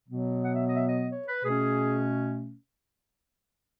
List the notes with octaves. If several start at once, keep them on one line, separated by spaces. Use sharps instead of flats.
B2 F#3 B3
F#5
E5
D#5
E5
D#5
C#5
B4
B2 A3 C#4 G#4